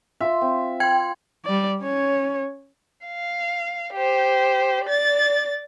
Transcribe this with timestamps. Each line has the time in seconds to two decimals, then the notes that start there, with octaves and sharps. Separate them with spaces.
0.21 F4 E5 C6
0.41 C4
0.80 G5 B5 C6 G#6
1.45 G3 D5
1.81 C#4 C#5
3.06 F5
3.94 G4 C5
4.85 D5 A6